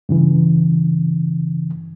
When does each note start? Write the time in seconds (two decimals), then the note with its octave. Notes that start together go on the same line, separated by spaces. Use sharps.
0.09 G2 C#3 E3